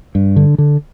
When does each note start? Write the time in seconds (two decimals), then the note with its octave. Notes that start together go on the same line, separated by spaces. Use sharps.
0.15 G2
0.36 D3
0.58 D3